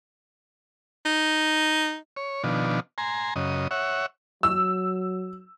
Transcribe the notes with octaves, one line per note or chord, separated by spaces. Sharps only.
D#4
C#5
B2 D#3 F3 D4
G#5 A#5 C6
F#2 C#3 D#5
C#5 E5 F#5
F#3 E6